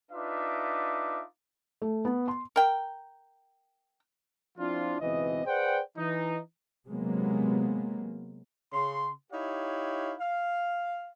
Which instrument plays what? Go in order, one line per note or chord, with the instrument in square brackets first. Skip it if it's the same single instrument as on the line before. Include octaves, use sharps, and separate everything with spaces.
[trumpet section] D4 D#4 F4 B4 E5 D6
[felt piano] A3
B3
C6
[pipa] A#4 G5
[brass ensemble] F3 C4 D4 E4 F4
C#2 B2 E3 C4 D#5
G#4 B4 C5 D5 F#5 G5
E3 D#4
[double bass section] C3 F#3 G#3 A#3 B3
[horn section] C#3 C6
D#4 E4 G4 C#5 F5
F5